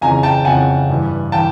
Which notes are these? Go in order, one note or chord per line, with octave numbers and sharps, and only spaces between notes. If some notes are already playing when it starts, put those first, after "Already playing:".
F2 C#3 E3 G#5 A#5
G5 A5
F2 C#3 E3 F#5 G#5
G2 E3
E3 G5 A5